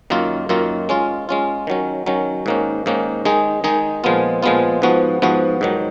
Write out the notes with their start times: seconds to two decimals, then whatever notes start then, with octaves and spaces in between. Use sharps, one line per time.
0.10 F#2 D#3 A#3 F4
0.49 F#2 D#3 A#3 F4
0.89 G#3 C#4 F4
1.29 G#3 C#4 F4
1.67 D#3 F#3 C#4
2.06 D#3 F#3 C#4
2.46 G#2 D#3 A#3 C#4
2.86 G#2 D#3 A#3 C#4
3.25 D#3 G#3 D#4 G#4
3.64 D#3 G#3 D#4 G#4
4.04 A#2 F3 G#3 B3 F4
4.43 A#2 F3 G#3 B3 F4
4.82 G#2 F3 B3 F#4
5.22 G#2 F3 B3 F#4
5.61 G#2 D#3 F#3